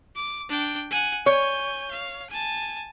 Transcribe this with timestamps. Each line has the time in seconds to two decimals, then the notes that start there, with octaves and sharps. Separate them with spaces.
0.16 D6
0.49 D4 G5
0.91 F#5 G#5
1.26 C#5 G#5 G6
1.91 F5
2.30 G#5 A5